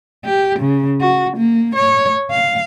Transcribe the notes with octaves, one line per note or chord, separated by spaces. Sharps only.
G4
C#3
F#4
A#3
C#5
F5